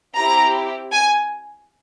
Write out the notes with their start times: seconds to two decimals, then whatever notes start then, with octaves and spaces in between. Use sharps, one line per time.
0.16 C4 E4 G4 A#5
0.92 G#5